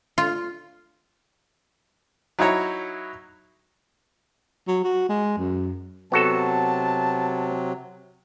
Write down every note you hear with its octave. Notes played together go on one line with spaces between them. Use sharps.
F4
F#3 D#4 E4 C#5 A#5
F#3
F#4
G#3
F#2
C3 F#3 B3 F#4 A4 A5